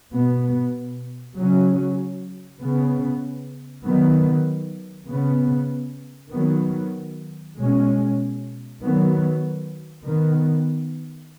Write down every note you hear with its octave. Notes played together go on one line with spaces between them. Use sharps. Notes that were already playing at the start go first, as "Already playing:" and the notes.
B2 B3
C#3 F#3 C#4
C#3 B3
D#3 F#3 B3
C#3 B3
D#3 F#3 B3
B2 G#3 C#4
D#3 F#3 B3
D#3 B3